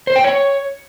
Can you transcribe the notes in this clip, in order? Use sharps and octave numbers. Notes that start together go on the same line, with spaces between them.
C5
G5
C#5